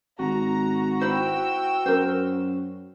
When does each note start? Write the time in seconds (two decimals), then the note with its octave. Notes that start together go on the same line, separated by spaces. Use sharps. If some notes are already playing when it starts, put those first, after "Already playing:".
0.19 G#1 F#4 A#5
1.01 E4 C5 G5 E6
1.86 F#2 A#4 C5